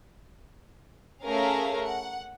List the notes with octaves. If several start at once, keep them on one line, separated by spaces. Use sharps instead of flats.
A3 C#4 G#4 A#4 F5
F#5